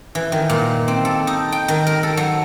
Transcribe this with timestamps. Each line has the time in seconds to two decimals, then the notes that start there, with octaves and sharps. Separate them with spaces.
0.15 E3
0.32 D#3
0.50 A#2
0.88 C4
1.05 A4
1.27 D#4
1.52 G5
1.68 D#3
1.87 A#4
2.03 A4
2.17 F#3